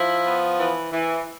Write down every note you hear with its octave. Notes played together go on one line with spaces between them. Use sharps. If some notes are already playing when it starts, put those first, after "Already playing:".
Already playing: F3 E4
B3
E3
E3